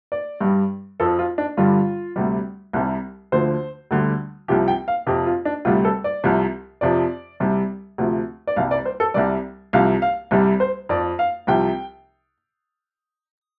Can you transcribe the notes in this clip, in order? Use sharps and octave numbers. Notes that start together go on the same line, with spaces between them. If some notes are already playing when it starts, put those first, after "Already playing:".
D5
G2 G3
F2 F3 A4
F4
D4
G2 D3 G3 F4
D2 C3 G3
C2 C3 G3
D2 D3 F3 C5
D2 D3 G3
C2 C3 F3 G4
G5
F5
F2 C3 F3 G4
F4
D4
D2 C3 G3 F4
A4
D5
C2 C3 F3
F2 C3 F3 D5
C2 C3 G3
D2 C3 F3
D5
C2 C3 G3 F5
D5
C5
A4
C2 C3 G3 D5
C2 C3 F3 F5
F5
C2 C3 G3
C5
F2 F3 D5
F5
C2 C3 F3 G5